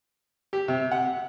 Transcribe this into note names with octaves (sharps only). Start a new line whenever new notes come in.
G4
C3
F#5